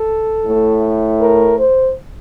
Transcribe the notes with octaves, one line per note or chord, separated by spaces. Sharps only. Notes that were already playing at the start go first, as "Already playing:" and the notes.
Already playing: A4
A2 A3
A#4
C5